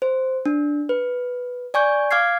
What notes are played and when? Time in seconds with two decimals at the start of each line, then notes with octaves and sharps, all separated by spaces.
0.02 C5
0.46 D4
0.89 B4
1.74 D5 G#5 C#6 G6
2.11 F5 D6 F6 G#6 C7